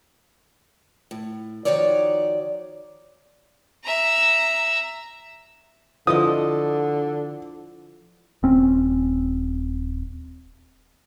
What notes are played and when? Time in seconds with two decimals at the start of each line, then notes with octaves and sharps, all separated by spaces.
1.11 A2
1.65 D#3 F3 D#4 F#4 C#5 D5
3.84 E5 A#5
6.07 D3 F3 E4 D#5 D#6
8.43 D#1 C4 C#4